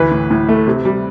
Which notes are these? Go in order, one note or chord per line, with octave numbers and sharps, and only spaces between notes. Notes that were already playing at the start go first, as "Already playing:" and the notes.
Already playing: D2 E3 B4
A2
A2
A3
C3
G3